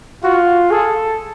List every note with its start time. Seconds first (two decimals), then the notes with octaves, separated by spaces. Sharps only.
0.24 F4 F#4
0.70 G#4 A4